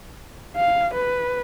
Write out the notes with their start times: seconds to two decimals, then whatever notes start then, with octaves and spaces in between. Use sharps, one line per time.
0.57 F5
0.94 B4